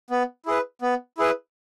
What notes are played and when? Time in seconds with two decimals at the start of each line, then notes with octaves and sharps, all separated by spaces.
0.10 B3
0.46 E4 G#4 B4
0.82 B3
1.18 E4 G#4 B4